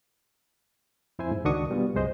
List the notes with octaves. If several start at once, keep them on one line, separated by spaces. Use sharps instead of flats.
F2 E4 C5 G#5
G#2
C#2 D#3 D4 F#4 C#6 D#6
B2 G3 B3 F4
C2 F#2 G#3 C5 D#5